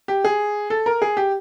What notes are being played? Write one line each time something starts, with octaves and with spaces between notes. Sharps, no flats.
G4
G#4
A4
A#4
G#4
G4